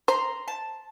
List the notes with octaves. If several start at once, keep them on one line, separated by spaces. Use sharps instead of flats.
C5 A#5 C6
A5